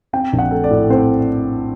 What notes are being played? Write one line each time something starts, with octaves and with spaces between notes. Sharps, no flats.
C4 G5
A#1
F#5
A3
D5
A2
C4 C5